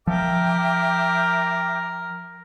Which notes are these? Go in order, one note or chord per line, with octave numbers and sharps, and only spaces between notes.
F3 A#4 E5 G5 D6